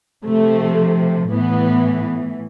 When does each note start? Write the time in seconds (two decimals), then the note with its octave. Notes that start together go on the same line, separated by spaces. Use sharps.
0.25 C3 F3 A3
1.30 A2 E3 B3